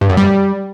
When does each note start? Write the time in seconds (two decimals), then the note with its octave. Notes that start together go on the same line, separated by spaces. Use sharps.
0.01 G2
0.09 F#2
0.17 G3